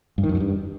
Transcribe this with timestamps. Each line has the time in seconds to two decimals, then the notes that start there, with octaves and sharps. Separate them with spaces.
0.18 G2
0.24 D#3
0.29 F#2
0.35 F#3
0.40 G2